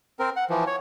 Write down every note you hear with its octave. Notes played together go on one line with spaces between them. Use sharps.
C4 A#4
F#5
E3 F3
C#5